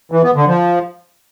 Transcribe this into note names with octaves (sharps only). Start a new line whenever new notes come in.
E3
B3
D3
F3